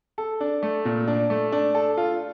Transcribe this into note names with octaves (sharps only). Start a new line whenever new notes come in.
A4
D4
A3
A#2
D4
A3
D4
A4
F4